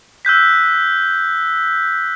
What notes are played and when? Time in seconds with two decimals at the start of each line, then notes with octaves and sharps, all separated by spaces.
0.25 E6 F#6 G6 B6